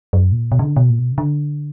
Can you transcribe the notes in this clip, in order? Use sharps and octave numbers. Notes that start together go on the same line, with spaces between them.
F#2
A#2
B2
C#3
D3
B2
A#2
B2
C#3
D3